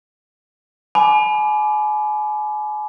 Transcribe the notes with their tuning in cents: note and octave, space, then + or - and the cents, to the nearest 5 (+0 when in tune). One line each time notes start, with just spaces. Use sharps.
G#5 +35 B5 +0 D6 +0